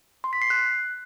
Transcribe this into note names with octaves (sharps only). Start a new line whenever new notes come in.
C6
B6
C7
F#6